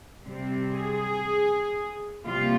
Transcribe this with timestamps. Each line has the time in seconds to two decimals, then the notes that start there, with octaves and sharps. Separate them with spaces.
0.24 C3 G3 C4
0.74 G#4
2.25 C3 G3 A#3 F4